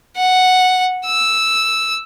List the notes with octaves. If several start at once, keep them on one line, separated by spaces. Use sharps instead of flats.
F#5
E6